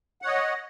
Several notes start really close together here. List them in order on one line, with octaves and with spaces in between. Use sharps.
F#5 C#5 D#5